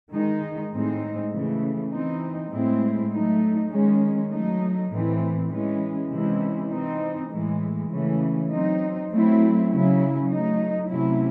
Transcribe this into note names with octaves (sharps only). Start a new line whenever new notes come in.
D#3 G#3 D#4
A2 G#3 C4 D#4
C#3 E3 A3
E3 C4 D#4
A2 G#3 C4 E4
F#3 A3 D#4
D#3 G#3 C#4
F#3 A3 D#4
A2 E3 C4
E3 G#3 C#4
C3 E3 G#3 C#4 E4
E3 C4 D#4
A2 E3 G#3
C#3 E3 A3 C#4
F#3 C4 D#4
F#3 A3 C4 E4
C#3 F#3 C#4 E4
F#3 A3 D#4
C3 F#3 A3 C#4 E4